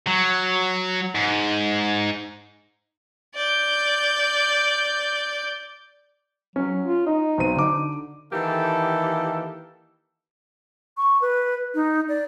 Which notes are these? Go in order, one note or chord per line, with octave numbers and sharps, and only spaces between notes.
F#3
G#2
D5 G6
F#3 C#4
F4
D#4 D#5
B1 C4 D#7
D3 D6
D#3 E3 A#3 G4 A4
C#6
B4
D#4
D5